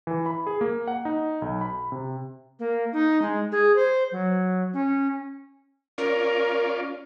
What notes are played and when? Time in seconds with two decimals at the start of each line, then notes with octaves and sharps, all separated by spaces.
0.07 E3
0.26 B5
0.47 G#4
0.61 A#3
0.88 F#5
1.05 D#4
1.42 B1
1.61 B5
1.92 C3
2.59 A#3
2.93 D#4
3.22 G#3
3.52 G#4
3.76 C5
4.12 F#3
4.74 C#4
5.98 C#4 F4 A#4 D5